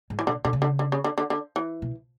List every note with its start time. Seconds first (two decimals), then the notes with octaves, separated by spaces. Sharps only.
0.10 G#2
0.19 E3
0.27 B2 D3
0.45 B2 D3
0.53 C#3
0.62 D3
0.79 D3
0.92 C#3
1.04 D3
1.18 D3
1.30 D3
1.56 E3
1.82 B2